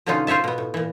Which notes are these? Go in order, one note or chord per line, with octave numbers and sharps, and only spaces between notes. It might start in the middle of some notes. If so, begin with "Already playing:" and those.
B2 D3 F#3 C#4 D#4 F4
F4 C5 C#5 E5 A5
B2 B3
A2
A#2 E3